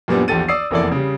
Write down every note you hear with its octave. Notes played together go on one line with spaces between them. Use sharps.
F#2 A#2 G3 B3 D4
A#1 E2 G4 A4 A6 D#7
D5 D#6 E6 C7
F1 E2 A#3 E4 A4 D5
C#3 G3